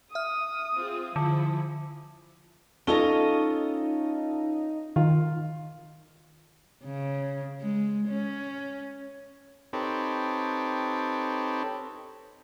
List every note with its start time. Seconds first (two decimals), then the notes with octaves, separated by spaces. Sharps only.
0.15 E5 D#6 F6
0.75 C4 F4 G#4
1.16 D3 F3 E4
2.87 C#4 D#4 F4 A4 D#5 G7
4.96 D#3 F4
6.84 C#3
7.61 G#3
8.09 C#4
9.73 C4 D#4 G4 A4 B4 C#5